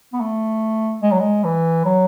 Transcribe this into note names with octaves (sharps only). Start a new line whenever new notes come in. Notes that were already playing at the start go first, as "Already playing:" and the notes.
B3
A3
G#3
F#3
G#3
E3
F#3